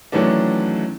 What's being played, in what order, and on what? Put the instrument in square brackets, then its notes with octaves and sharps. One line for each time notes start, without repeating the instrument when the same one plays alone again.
[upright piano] D#3 E3 F#3 A3 C#4 D4